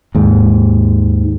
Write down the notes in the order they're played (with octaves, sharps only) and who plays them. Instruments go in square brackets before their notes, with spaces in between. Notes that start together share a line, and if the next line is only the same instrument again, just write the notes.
[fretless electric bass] D#2 G#2